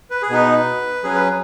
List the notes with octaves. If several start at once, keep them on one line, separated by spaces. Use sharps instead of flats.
B4
G#4
B2 B3 D#4 B4
F#3 C#4 G#4
B4